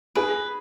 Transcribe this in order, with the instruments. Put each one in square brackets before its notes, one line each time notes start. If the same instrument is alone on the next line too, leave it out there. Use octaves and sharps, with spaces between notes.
[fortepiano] G#4 G#5 [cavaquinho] B4